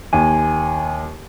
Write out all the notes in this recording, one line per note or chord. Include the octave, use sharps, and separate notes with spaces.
D#2 G#5